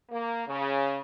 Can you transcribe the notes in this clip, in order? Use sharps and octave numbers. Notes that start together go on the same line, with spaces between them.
A#3
C#3